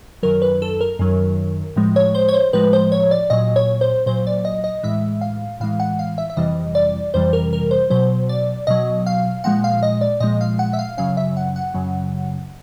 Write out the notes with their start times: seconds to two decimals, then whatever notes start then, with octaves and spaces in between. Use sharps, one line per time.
0.23 F#2 D#3 F#3 A#4
0.42 B4
0.62 A4
0.81 A#4
0.99 F#2 D#3 F#3
1.76 A2 F3 G#3
1.96 C#5
2.15 C5
2.28 C#5
2.34 C5
2.53 A2 F3 G#3 B4
2.73 C5
2.92 C#5
3.11 D5
3.30 A#2 F#3 D#5
3.56 C#5
3.81 C5
4.06 A#2 F#3 C5
4.27 D5
4.45 D#5
4.64 D#5
4.83 A2 E3 G#3 E5
5.21 F5
5.60 A2 E3 G#3 F5
5.80 F#5
5.99 F5
6.18 E5
6.30 E5
6.37 F2 C3 E3 G3 D#5
6.75 D5
7.14 F2 C3 E3 G3 C5
7.33 A#4
7.53 A#4
7.71 C5
7.90 B2 F#3 C5
8.29 D5
8.67 B2 F#3 D#5
9.06 F5
9.44 A#2 F3 G#3 F#5
9.64 F5
9.83 D#5
10.01 D5
10.20 A#2 F3 G#3 D#5
10.41 F5
10.59 F#5
10.73 E5
10.79 F5
10.97 F#2 C#3 F#3 F5
11.17 E5
11.37 F#5
11.56 F#5
11.74 F#2 C#3 F#3